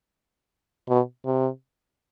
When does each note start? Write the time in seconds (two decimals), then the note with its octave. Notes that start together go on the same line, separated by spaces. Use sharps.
0.89 B2
1.26 C3